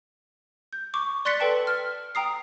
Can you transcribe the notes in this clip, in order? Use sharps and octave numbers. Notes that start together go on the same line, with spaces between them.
G6
C#6 D6
D5 C6 F#6 A6 B6 C#7
A4 B4 G5 A5
F6
G5 A#5 D#6 C7